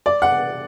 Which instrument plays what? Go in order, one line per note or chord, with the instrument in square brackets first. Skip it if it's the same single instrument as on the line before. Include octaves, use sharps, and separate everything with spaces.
[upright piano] D5
F#5